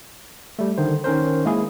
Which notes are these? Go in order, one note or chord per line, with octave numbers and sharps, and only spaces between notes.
G3 A3
D3 D#3 C5
D#3 C#4 A#4 C5
G#3 A#3 E4 G#4